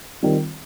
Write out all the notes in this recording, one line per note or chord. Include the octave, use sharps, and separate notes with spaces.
D#3 G3 C4 F4